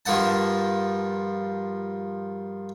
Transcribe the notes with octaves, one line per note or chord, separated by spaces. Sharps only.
G2 F3 A#3 F#5 A5